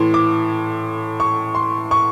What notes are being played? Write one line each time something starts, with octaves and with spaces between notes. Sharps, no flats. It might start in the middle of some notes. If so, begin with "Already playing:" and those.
Already playing: A2 E3 C6
D6
C#6
C6
C#6